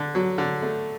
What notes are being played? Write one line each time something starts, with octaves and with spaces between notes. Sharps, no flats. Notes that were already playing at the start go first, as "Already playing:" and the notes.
Already playing: D3
F#3
D3
A3